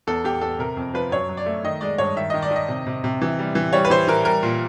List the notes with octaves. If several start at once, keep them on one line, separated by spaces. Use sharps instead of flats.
E2 A4
E2 G4
E2 A4
C3 A#4
F2
F3 B4
F#2 C#5
F#3
D5
A3
D#3 D#5
G#3 D5
G2 C#5
D#3 E5
D#3 D#5
D5
D#3
D#5
C3
C3
C3
E3
G3
E3
G3 C#5
B4
E3 C5
E3 A#4
G3 A#4
A#2